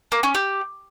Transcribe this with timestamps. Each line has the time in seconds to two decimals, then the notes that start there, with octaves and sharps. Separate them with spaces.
0.12 A#3
0.23 C#4
0.35 G4